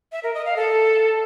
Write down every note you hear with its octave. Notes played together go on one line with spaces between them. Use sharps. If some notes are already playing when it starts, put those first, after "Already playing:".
E5
A#4
D#5
F5
A4